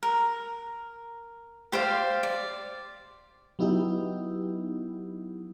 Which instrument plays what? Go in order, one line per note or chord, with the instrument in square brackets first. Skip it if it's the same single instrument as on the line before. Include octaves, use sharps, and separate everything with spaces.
[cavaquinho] A#4
G4 C5 D5 F5
D5
[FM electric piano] F#3 B3 D#4 E4 G4